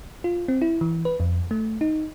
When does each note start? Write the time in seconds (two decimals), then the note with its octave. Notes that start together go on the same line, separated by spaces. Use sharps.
0.24 F4
0.48 C4
0.62 E4
0.81 E3
1.05 B4
1.20 F2
1.51 A3
1.81 D#4